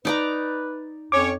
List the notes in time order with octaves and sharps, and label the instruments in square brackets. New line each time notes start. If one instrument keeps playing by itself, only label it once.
[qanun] D#4 D5 A#5 [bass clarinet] B4
[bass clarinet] F2 [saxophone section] C#4 C#5 [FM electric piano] D6